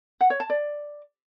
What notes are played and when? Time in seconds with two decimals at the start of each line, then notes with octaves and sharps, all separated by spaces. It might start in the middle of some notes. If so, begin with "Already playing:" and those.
0.21 F#5
0.30 C#5
0.40 A5
0.50 D5